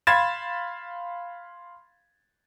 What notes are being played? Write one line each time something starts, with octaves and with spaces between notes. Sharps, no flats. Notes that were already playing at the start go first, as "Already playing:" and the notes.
F5 B5 C6 G#6 A6 E7